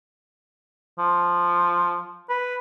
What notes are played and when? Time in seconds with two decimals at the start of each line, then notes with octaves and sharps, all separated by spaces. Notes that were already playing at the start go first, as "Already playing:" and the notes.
0.99 F3
2.30 B4